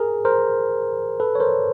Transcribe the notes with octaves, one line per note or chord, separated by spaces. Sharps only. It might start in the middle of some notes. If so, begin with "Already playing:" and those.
Already playing: G#4 A#4
A#4 C5
A4 B4
C#5
A#4 C5